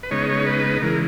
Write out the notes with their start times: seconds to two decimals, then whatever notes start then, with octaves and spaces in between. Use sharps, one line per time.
0.03 B4
0.11 C#3 G#3 B3 D#4 C#5
0.29 C#5
0.47 B4
0.82 C#3 E3 G#3 A#4